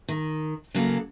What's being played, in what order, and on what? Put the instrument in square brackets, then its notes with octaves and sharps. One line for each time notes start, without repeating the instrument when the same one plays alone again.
[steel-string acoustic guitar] D#3
C#3 F#3 A#3 A4